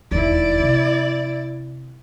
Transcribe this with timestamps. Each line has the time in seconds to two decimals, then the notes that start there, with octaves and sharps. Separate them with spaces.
0.11 E1 D#2 E4 D5
0.60 C3